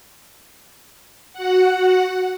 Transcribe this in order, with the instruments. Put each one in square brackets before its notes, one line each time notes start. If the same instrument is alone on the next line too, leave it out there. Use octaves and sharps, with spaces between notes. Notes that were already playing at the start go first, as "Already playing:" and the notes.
[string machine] F#4 F#5